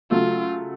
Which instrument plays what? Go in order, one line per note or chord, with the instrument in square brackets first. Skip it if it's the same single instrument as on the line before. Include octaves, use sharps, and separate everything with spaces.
[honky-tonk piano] C#3 F#3 A3 [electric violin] F4